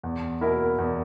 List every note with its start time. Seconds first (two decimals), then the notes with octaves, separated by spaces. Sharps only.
0.03 E2
0.41 B2 A#3 E4 A#4
0.78 E2